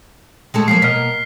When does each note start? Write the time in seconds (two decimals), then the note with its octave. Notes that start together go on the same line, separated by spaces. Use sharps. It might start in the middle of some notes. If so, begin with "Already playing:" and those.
0.54 G#3 A3 A4
0.68 F3 F#3 A#3 C7
0.82 B2 A#3 D#5 F6 B6